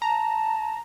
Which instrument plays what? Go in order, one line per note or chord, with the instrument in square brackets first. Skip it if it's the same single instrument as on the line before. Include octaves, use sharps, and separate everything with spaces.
[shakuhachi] A5 [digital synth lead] A#5